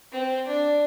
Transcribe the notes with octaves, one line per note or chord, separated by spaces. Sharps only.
C4
D4